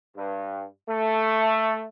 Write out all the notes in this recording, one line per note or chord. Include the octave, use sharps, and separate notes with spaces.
G2
A3